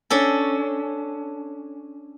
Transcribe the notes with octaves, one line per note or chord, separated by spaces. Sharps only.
C#4 D4 A4